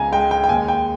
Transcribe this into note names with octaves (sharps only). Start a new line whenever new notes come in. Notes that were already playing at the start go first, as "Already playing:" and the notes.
Already playing: C#2 B3 G#5 A#5
G#3 G5
G5
G5
D#2 G#5
G5